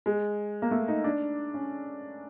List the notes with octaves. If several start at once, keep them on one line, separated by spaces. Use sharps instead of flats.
G#3
A#3
A3
D#4
D4
C#4